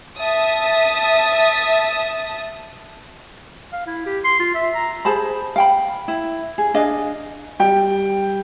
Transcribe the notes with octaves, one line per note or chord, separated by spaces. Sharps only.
E5 A5 D#6
F5
E4
G4
C6
F4
E5
A#5
G#4 C5 A5 B5
F5 G5 B5
E4
G#4
D4 G#4 D#5 F5
G3 G5